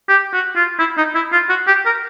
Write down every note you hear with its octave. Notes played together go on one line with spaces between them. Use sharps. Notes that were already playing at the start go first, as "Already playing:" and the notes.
G4
F#4
F4
E4
D#4
E4
F4
F#4
G4
A#4